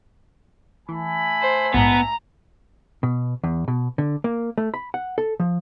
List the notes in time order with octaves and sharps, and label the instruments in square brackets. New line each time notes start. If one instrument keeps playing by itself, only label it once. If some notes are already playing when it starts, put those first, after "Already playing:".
[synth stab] E3 [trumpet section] A3 G#5 B5
[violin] C5
[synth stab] A#1 G#2 [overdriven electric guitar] B3 [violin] A#5
[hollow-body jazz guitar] B2
E2
B2
D3
A#3
A3
B5
F#5
A4
F3